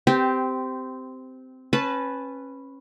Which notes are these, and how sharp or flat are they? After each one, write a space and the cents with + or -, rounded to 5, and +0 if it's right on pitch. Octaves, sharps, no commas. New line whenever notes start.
C4 -15 G4 +0
C#4 -25 B4 +0 A5 -15